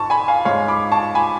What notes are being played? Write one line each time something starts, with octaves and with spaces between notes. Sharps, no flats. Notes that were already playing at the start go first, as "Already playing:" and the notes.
Already playing: G#2 A5 C#6
G#5 B5
F5 G#5
G#2 G#3 C#5 F5
B5 D6
A5 C#6
G#5 B5